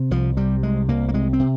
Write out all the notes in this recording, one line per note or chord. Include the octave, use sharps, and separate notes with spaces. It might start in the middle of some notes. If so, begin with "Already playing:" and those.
Already playing: C3
C2 F3
C3 G3
C2 G#3
C2 A#3
A#3
C3 G#3
C4
C3